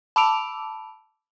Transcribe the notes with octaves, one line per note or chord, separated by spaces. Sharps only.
A5 B5 D6 E6 D7 F7